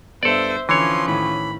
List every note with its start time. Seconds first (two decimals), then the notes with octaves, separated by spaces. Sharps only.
0.23 G2 B3 A4 C5 D5 E5
0.69 D3 E3 F3 C#4 C#5 C6
1.08 A2 D#3 B5